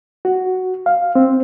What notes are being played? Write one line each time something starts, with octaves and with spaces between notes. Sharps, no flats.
F#4
F5
C4